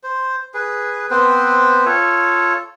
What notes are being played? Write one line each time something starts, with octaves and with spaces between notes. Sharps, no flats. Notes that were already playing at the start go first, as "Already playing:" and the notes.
C5
G#4 B4
B3 C4 B4 C5
F4 A4 C#5